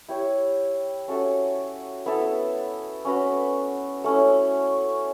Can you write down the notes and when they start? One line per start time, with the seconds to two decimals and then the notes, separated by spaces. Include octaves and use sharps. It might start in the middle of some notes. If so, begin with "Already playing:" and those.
0.08 E4 G4 C#5
1.08 C#4 F#4 A4 E5
2.06 B3 E4 A4 E5
3.05 C#4 F#4 B4
4.04 A3 C#4 E4